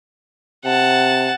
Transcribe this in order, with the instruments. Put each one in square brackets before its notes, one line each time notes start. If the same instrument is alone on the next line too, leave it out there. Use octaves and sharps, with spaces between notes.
[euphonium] C3 [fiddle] F#5 A5